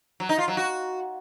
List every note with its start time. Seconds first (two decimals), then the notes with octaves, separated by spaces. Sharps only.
0.20 F#3
0.29 D#4
0.39 F4
0.48 F#3
0.57 F#4